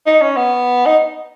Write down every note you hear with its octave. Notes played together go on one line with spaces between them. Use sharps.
D#4
C#4
B3
D#4